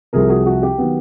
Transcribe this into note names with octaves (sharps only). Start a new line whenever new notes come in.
C2 C3 F3 G#4 A#4
F#4 G#4
F#4
G4
D#3 F#3 B3